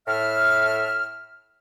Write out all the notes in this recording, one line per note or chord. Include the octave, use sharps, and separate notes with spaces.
A2 E5 F6